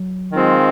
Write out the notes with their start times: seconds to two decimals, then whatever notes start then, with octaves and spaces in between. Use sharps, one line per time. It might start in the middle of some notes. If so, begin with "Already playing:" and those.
Already playing: F#3
0.32 D#3 G#3 C4 F4